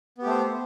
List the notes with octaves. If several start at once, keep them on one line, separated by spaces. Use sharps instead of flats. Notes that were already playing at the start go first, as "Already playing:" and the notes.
A3 B3 G4 C5